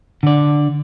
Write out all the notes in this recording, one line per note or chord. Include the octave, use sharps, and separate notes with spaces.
D3 D5